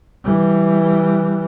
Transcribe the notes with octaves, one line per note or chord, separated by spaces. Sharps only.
E3 G3